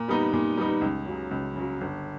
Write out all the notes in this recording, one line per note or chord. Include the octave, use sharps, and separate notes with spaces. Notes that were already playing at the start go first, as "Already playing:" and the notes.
Already playing: A#2
G3 B3 D#4
A#2
G3 B3 D#4
C#2
C#3 F#3
C#2
C#3 F#3
G1